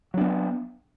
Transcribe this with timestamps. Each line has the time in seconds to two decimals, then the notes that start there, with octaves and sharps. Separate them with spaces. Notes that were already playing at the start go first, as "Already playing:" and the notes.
0.14 F#3
0.17 D4
0.21 B3